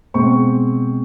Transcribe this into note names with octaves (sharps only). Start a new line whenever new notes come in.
B2 G#3 C4 C#6